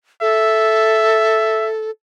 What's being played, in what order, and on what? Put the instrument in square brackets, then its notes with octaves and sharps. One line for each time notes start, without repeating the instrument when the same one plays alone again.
[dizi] A4 [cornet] E5